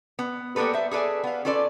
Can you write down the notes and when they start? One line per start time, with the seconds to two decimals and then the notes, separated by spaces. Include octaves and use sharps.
0.19 B3
0.56 G3 A#3 B3 A4 B4
0.73 C5 E5
0.91 G#4 A4 B4 D5 G#5
1.24 B3 F5
1.45 C#4 F4 A4 B4 D5